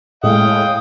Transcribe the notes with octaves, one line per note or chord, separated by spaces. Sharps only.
A2 G#3 F5 G5 D#6